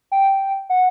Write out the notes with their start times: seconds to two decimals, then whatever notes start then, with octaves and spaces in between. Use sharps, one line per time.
0.12 G5
0.70 F#5